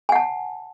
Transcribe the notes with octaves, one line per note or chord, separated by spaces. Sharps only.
F#5 G#5 A5